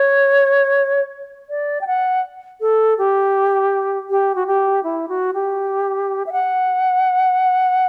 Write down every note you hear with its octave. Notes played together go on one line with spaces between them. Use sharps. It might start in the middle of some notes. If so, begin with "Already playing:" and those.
Already playing: C#5
D5
G5
F#5
A4
G4
G4
F#4
G4
E4
F#4
G4
E5
F#5